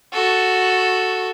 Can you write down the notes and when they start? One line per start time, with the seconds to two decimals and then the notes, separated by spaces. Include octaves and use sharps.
0.13 F#4 A4